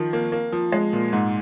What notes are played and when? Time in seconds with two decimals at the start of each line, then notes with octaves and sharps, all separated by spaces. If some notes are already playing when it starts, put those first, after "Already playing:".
Already playing: D#3 F3
0.13 A#3
0.32 A#3
0.52 F3
0.72 G#3
0.93 A#2
1.13 G#2